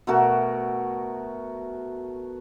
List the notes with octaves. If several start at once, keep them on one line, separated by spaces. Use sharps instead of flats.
B2 A3 F#4 A#4